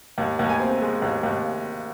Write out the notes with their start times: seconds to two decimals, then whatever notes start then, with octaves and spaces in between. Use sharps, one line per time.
0.18 D#2
0.39 D#2
0.49 G#5
0.60 C4
0.82 G#3
1.02 D#2
1.23 D#2